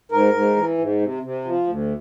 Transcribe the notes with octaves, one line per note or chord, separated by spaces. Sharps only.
G#2 A#4
G#2
E3
G#2
C3
C3
F3
D2